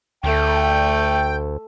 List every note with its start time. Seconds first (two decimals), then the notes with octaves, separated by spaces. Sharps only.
0.24 D2 A3 G5